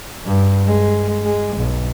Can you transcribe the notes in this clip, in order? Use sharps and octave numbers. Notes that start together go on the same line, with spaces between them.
G2
G#3
G#3
B1